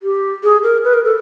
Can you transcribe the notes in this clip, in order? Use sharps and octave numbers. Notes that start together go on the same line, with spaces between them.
G4
G#4
A#4
B4
A#4
A4